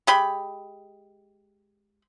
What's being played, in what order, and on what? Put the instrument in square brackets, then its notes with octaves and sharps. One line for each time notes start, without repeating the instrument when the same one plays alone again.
[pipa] G#3 G4 B5